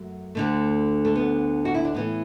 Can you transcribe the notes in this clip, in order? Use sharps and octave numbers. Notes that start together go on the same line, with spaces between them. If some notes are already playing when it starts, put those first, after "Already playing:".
Already playing: F#2 F#3 A3
D2 D3 A3
A3
B3
F#4
E4
D4
A2 E3 A3 B3